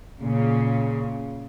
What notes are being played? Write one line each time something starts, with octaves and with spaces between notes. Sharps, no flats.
A#2 C#3